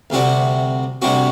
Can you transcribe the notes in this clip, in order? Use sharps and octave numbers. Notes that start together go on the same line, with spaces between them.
D2 C3 G3 C4 F#4
D2 C3 G3 C4 F#4